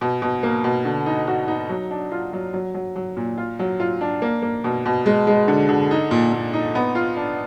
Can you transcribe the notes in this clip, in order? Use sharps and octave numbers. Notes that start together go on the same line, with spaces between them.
B2
B2
A#3
B2
D3
D#4
F#4
D#4
F#3
D4
F4
F#3
F#3
F#3
F#3
A#2
F4
F#3
F4
D4
A#3
A#3
B2
B2
G#3
G#3
D3
D3
D#4
A#2
A#2
D#4
B3
F4
D4